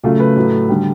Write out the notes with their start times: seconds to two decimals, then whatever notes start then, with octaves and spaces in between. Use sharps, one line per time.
0.03 C#3 F#3 A3 F4
0.20 B4
0.37 A2 F#3 A3
0.69 D3 G3